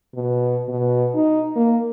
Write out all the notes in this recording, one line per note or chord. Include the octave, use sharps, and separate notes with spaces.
B2
B2
D#4
A#3